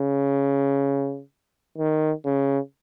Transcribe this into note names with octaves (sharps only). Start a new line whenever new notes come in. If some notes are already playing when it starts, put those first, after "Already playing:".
Already playing: C#3
D#3
C#3